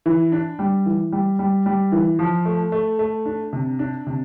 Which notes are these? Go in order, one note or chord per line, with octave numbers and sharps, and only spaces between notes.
E3
D4
G3
E3
G3
G3
G3
E3
F3
A3
A3
A3
D4
C3
D4
C3